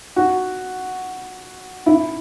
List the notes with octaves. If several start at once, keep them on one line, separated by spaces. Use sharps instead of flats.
F#4
E4